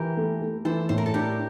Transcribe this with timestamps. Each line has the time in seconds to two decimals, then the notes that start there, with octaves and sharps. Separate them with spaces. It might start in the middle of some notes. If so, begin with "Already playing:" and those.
Already playing: E3 G4 A#4
0.17 A3
0.41 A3
0.65 E3 A4 C5
0.89 A2 C5
0.98 A#4
1.06 A4
1.14 D4 G4 A#4